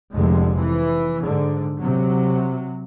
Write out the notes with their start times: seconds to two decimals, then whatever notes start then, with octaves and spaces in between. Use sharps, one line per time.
0.12 F1 F2 D3 G#3
0.57 E3
1.22 G#2 D3
1.79 C3 F#3